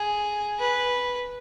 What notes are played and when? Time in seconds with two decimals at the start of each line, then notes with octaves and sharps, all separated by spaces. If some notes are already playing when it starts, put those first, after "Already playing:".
Already playing: G#4
0.59 B4